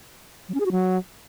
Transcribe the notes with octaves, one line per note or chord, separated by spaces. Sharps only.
F#3
C#4
G#4
F#4
F#3